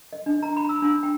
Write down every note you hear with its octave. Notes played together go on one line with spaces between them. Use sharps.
D#5
D4
A#5
B5
E6
D4
G5